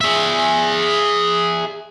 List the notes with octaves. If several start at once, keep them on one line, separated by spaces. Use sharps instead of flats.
G#4 E5